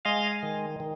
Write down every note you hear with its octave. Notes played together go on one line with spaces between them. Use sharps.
G#3 D#5 F5
D#3
D#3